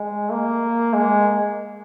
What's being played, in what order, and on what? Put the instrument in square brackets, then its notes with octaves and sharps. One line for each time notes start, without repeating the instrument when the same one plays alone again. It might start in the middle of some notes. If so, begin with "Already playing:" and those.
Already playing: [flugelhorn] G#3
A#3
G#3